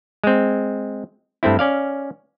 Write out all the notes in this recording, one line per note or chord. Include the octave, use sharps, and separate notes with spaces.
G#3 C4
G2 A3 C4 E4
C#4 D5 F5